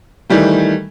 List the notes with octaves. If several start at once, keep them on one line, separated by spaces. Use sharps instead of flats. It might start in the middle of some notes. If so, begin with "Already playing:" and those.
D#3 E3 G3 A3